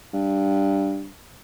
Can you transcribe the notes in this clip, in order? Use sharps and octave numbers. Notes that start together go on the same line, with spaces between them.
G2